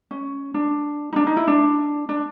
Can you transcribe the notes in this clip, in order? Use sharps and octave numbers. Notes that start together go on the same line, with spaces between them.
C#4
D4
D#4
D4
D#4
E4
D4
D4